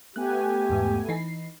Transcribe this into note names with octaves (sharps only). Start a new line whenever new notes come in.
A3 B3 G4 G#5 F#6
E2 G#2
E3 D#4 C7